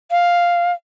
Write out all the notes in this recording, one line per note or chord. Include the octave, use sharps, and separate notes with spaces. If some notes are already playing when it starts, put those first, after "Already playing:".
F5